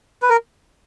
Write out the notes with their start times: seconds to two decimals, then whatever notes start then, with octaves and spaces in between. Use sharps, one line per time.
0.22 B4
0.30 A#4